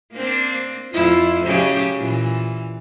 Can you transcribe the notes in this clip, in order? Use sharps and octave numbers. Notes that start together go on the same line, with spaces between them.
A#3 C4 D4
F2 E4 F4
C#3 F#3 G4
A#2 E3